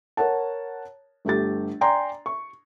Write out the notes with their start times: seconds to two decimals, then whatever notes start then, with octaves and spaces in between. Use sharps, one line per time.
0.17 A#4 C#5 F#5 A5
1.25 G1 A3 G4 A6
1.81 D5 G5 G#5 A#5 C6
2.26 C#6